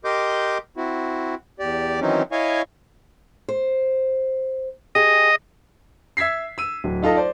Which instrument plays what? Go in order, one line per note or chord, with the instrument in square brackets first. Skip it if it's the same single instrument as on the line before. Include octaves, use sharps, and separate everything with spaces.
[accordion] G4 A#4 D#5 C6 D6 G6
C4 E4 F#4
E2 G4 D5
D#3 E3 F#3 C4 C#4 D#4
E4 C#5 D#5 F5 G#5 C#6
[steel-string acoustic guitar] C5
[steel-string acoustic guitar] G4 G#4 [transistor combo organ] D#5
[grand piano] E5 E6 G#6 B6 C7
E6 D#7
D1
D#4 F4 A4 D#5 A5
C5 D5